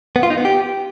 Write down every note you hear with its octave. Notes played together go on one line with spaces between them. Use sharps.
B3
F4
D#4
B3
G4